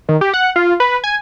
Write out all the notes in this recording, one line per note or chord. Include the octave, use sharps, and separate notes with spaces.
D#3
G4
F#5
F4
B4
G#5